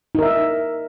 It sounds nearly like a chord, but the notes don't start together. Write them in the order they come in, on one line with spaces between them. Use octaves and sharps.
D#4 A#4 E5